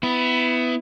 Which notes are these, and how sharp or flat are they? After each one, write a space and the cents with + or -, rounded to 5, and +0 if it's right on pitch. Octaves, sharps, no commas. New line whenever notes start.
B3 +20 E4 +0